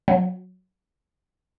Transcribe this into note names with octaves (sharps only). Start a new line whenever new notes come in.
F#3